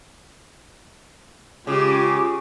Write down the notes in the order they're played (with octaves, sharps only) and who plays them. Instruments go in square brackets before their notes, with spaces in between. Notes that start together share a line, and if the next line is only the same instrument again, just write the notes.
[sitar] C#3 [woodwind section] G#3 G#4 D6 [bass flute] F4 [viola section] G4